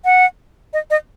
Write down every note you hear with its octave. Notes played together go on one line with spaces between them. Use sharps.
F#5
D#5
D#5